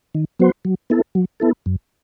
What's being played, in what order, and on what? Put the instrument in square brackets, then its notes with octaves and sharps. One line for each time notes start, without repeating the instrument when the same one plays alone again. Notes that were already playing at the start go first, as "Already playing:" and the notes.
[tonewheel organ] D#3
F#3 B3 F#4 C5
F#3
B3 E4 A4
F#3
B3 E4 A4
F#2